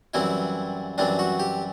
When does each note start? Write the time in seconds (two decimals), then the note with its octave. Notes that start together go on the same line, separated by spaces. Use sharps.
0.14 F#2 E3 G3 C4 E4
0.98 F#2 E3 G3 C4 D4
1.19 F#4
1.39 G4